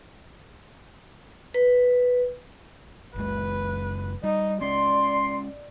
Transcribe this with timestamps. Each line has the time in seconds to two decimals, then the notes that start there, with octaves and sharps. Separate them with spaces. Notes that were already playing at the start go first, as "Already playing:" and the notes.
1.54 B4
3.16 F#1 G#3 B4
4.24 G3 D#4
4.61 G#3 C#4 D5 C6